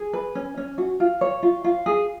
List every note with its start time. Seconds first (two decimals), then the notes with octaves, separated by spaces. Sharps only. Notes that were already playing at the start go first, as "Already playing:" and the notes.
Already playing: G#4
0.13 B4
0.35 C#4
0.57 C#4
0.78 F#4
1.00 F4
1.21 C#5
1.43 F4
1.64 F4
1.86 G#4